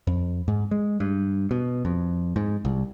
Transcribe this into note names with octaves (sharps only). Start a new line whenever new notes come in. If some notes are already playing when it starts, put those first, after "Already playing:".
F2
G#2
G#3
G2
B2
F2
G#2
C2